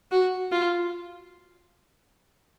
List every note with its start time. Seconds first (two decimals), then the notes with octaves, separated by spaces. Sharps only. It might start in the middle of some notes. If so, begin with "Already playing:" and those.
0.11 F#4
0.51 F4